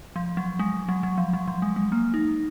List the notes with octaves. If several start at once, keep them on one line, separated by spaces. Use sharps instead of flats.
F3
F#3
G#3
F#3
F#3
F3
F#3
F3
G#3
G#3
A#3
D#4